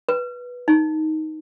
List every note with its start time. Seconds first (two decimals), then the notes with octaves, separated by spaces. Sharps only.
0.09 B4
0.68 D#4